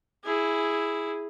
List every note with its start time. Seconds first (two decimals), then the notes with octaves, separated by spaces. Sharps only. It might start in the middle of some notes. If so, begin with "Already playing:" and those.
0.24 E4 G#4